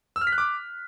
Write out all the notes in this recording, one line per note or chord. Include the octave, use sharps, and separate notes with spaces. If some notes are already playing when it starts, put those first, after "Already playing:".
E6
F6
B6
F#6
D6